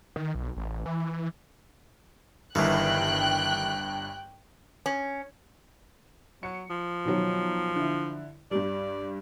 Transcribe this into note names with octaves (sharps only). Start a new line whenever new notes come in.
D#3
B1
A1
E3
G1 G2 D#3 E3 G5 F#6
C#4
F#3 C#7
F3
B2 D#3 F#3
D3 E4
G2 G3 D5